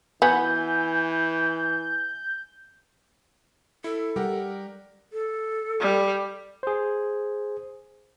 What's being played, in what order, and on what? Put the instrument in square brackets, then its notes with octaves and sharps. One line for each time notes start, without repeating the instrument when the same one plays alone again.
[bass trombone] E3 [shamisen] B3 F#4 [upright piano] G#5 [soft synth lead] G6
[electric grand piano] E4 [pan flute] A4
[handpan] G3 [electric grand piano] G4 A#4 F#5
[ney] A4
[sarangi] G3
[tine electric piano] G#4 C5